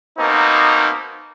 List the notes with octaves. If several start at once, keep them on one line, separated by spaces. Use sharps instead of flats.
B2 A#3 C4 D#4